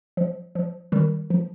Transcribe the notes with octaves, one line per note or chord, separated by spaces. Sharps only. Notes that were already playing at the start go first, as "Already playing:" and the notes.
F3
F3
D#3 G3
F3